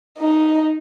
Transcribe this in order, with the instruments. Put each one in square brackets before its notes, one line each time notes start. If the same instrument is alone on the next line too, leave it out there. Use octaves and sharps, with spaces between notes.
[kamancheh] D#4